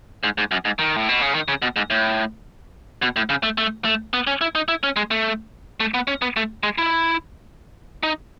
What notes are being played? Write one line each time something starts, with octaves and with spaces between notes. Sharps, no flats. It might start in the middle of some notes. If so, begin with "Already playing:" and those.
G#2
G#2
F#2
G#2
D#3
A2
B2
C#3
D#3
C#3
B2
G#2
A2
B2
A2
C#3
A3
A3
A3
B3
C#4
E4
D#4
E4
C#4
G#3
A3
A3
B3
C#4
B3
A3
G#3
E4
D#4